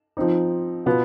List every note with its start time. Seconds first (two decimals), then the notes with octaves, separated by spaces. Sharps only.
0.17 F3 C4 D#4
0.86 B2 B3 F4